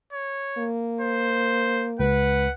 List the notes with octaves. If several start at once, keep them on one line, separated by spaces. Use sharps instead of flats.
C#5
A#3
C5
C#2 B4 F#5